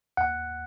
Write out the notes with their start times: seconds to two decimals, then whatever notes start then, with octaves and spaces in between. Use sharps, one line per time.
0.17 D#2 F#5